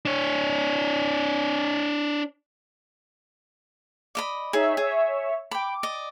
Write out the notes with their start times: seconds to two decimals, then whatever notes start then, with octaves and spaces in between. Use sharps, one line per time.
0.05 D4 C#5
4.15 D5 D#5 B5
4.53 D#4 G#4 C#5 E5
4.77 G#4 C#5 E5
5.51 G5 B5 D6
5.83 D5 D#5